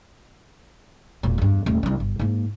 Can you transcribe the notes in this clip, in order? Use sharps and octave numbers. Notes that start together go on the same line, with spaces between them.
E1 A#2
E2 G2
D#1 A3
C2 D4
G1
G#2 A#3